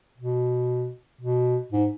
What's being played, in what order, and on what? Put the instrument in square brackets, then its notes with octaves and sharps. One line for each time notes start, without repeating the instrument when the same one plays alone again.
[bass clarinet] B2
B2
G#2